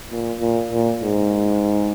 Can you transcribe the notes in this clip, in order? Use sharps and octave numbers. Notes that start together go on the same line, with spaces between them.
A#2
A#2
A#2
G#2